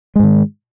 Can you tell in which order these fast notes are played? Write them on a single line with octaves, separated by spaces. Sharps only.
G#3 G#2 D#3